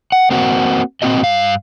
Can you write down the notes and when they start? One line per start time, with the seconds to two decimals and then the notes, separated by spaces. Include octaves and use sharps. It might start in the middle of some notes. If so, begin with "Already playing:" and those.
0.12 F#5
0.30 A#3 C4 F#4
1.02 A#2 A#3 C4 E4 F#4 D#5
1.23 G2 F5